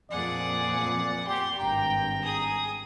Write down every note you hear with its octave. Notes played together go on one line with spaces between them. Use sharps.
F2 A#2 G#4 D5 F#5
G4 C6
G#1 G2 G5 A#5
G#4 D#6